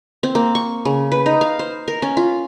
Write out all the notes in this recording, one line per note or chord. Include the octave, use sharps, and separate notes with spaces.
C4
A#3
C#6
C#3
B4
D#4
F5
C5
A#4
C#4
F4